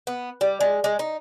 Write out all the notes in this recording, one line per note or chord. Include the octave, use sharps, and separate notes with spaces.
B3
G3
G#3
G#3
D#4